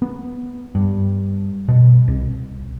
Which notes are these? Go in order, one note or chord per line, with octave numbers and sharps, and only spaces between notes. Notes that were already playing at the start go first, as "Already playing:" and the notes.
B3
G2
B2
C2